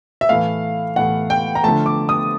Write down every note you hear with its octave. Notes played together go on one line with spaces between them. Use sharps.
E5
A2 E3 A3 F5
A2 E3 A3 F#5
G5
A#5
D3 F3 A3 A5
D6
D#6